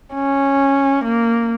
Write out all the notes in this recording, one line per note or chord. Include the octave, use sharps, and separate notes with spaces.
C#4
A#3